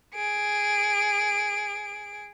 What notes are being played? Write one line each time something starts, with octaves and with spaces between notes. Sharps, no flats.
G#4 D7